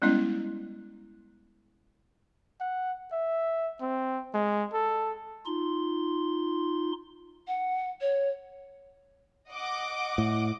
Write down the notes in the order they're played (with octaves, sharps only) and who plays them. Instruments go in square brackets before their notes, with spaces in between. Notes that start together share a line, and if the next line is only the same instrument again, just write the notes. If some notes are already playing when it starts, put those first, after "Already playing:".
[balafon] G3 G#3 B3 C#4 E4 D#5
[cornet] F#5
E5
C4
G#3
A4
[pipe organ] D#4 F4 C6
[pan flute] F#5
C#5
[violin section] D#5 F#5 D6
[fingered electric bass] A2